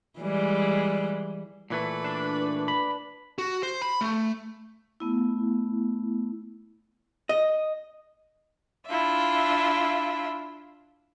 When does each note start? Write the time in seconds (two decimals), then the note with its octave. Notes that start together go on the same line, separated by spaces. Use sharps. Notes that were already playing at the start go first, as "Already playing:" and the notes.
0.19 E3 G3 G#3
1.70 A#2 E3 A3 B4
2.04 D4
2.68 B5
3.38 F#4
3.63 C5
3.82 B5
4.01 A3
5.00 A3 B3 E4
7.29 D#5
8.88 D4 E4 F4 E5